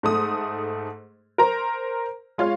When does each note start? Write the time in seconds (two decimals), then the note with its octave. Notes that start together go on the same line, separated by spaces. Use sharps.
0.03 G#2 A3 D#6
1.38 A#4 C5 A#5
2.38 G#3 F4 C#5 F5